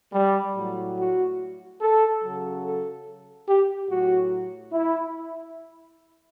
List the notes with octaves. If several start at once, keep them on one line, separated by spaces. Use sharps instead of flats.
G3
A2 F#3
F#4
A4
C#3 F#3
A4
G4
A2 F#3 F#4
E4